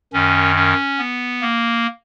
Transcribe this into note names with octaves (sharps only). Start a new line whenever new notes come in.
F#2 D#3 C#4
C#4
B3
A#3